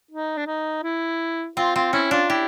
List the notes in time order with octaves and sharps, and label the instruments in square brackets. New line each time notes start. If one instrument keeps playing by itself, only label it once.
[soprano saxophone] D#4
D4
D#4
E4
[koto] C4 [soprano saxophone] F4
[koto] C4 [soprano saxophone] F4
[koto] C#4 [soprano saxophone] E4
[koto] D4 [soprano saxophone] F4
[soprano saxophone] E4 [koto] G4